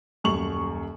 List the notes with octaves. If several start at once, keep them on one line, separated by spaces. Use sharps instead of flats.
D#1 F#2 C#6 F#7